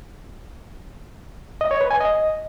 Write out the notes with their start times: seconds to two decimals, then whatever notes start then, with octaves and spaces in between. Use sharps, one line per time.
1.61 D#5
1.71 C#5
1.81 B4
1.91 G#5
2.00 D#5